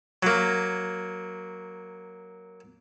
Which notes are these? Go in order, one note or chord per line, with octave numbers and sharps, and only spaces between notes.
F#3 A#3